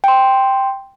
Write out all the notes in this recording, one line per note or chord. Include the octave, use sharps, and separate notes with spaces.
G5 C6